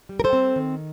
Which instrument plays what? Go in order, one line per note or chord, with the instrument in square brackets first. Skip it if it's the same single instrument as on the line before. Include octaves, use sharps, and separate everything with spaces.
[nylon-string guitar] G3
A#4
A4 C5
C4
D#3